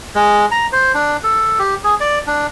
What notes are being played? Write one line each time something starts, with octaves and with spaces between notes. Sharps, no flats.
G#3
A#5
C5
D4
A4
G4
G#4
D5
D4